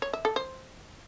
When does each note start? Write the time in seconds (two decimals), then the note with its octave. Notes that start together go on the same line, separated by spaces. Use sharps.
0.02 C#5
0.13 E5
0.25 A4
0.36 C5